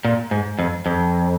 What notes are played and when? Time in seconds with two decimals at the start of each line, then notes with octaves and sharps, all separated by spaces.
0.05 A#2
0.31 G#2
0.59 F2
0.86 F2